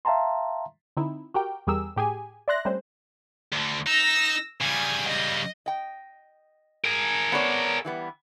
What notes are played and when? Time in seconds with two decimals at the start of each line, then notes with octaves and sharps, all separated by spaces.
0.05 E5 F5 G5 A5 A#5 C6
0.97 D3 C4 D#4 E4
1.34 F#4 G4 A#4 G5
1.67 E2 G3 G4 G#4 A#4 E6
1.96 A2 G4 G#4 G#5
2.48 D5 E5 C6 F#6 A#6
2.65 G3 A3 C4 C#4 C5
3.52 D2 D3
3.87 D#4 E6 A#6
4.61 C#3 G3 G#5
5.07 D#5
5.66 D#5 G5
6.84 G#4 A#4
7.32 B3 C#5 D5
7.85 E3 G3 B3